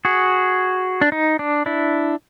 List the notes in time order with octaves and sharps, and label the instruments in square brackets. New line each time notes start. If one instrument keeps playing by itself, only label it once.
[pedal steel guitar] F#4 G#4
D4
D#4
D4
D4 E4